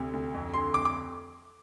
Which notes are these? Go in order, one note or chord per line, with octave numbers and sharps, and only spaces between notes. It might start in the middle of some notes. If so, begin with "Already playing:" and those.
Already playing: D2 C3
D2
F2
D3 C6
F2 D6
D6